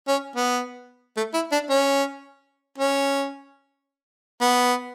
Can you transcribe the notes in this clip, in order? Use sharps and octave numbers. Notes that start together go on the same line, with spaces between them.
C#4
B3
A3
E4
D4
C#4
C#4
B3